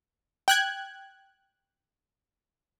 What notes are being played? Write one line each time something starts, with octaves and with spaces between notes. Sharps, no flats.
G5 F#6 G#6